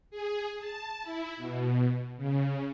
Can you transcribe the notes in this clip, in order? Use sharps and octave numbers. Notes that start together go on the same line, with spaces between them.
G#4
A5
E4
B2
C#3